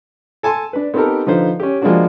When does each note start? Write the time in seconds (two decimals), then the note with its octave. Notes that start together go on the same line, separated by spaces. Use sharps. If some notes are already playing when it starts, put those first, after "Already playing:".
0.43 A4 G#5 A5 C6
0.73 D4 B4
0.94 B3 C4 D#4 G4 A4 A#4
1.27 D3 F3 D#4 F4 B4 C5
1.60 C#4 G4
1.82 F3 G#3 A#3 B3 D4 F#4